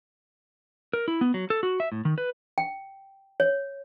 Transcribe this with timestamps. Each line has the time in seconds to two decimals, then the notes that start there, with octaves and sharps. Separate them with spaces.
0.93 A#4
1.08 E4
1.21 B3
1.34 F#3
1.50 A4
1.63 F#4
1.80 E5
1.92 A2
2.05 D#3
2.18 B4
2.58 G5
3.40 C#5